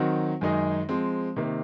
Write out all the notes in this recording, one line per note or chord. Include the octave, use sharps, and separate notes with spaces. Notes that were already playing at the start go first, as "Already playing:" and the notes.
Already playing: D#3 F#3 C4 F#4
F#2 D#3 G#3 D#4 G#4
F3 G#3 C4
C3 D#3 A#3